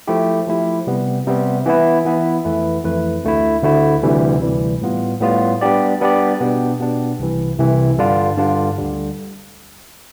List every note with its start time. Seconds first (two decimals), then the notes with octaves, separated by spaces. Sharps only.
0.08 F3 A3 E4 G4
0.47 F3 A3 E4 G4
0.87 C3 G3 B3
1.26 C3 G3 B3
1.66 E3 B3 E4
2.05 E3 B3 E4
2.45 F2 E3 A3 E4 B4
2.84 F2 E3 A3 E4 B4
3.25 D2 D3 A3 E4
3.63 D2 D3 A3 E4
4.03 D2 C3 E3 G3
4.42 D2 C3 E3 G3
4.82 A2 G3 B3 F4
5.21 A2 G3 B3 F4
5.61 G3 B3 D4 G4 D5
6.01 G3 B3 D4 G4 D5
6.41 B2 B3 D4 G4
6.80 B2 B3 D4 G4
7.19 C2 C3 E3
7.58 C2 C3 E3
7.98 G2 D3 G3 D4 F4
8.37 G2 D3 G3 D4 F4
8.78 D2 D3 G3